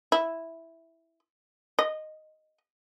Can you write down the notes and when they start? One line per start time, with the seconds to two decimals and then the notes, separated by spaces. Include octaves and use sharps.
0.12 E4
1.79 D#5